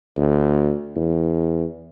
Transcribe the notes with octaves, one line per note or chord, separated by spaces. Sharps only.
D2
E2